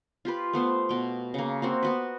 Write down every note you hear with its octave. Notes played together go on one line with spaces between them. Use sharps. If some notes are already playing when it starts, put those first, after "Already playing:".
F4 G4 B4
A3 B3 C5
B2 G5
C#3 A#3
A#3 C4 F#4
B3 F#4 B4